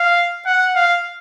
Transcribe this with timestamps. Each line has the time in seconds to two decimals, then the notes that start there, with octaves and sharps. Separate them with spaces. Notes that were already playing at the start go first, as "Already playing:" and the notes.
Already playing: F5
0.46 F#5
0.75 F5